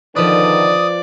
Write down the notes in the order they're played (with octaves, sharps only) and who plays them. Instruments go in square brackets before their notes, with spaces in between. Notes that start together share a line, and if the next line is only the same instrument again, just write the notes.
[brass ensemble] D3 D#3 [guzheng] F3 B4 [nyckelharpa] D5 [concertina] D#6